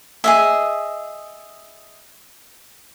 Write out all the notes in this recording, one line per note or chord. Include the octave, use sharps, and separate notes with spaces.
G#4 D#5 E5